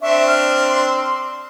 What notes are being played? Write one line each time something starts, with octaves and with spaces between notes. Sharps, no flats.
C4 D4 E5 C#6
F6
C6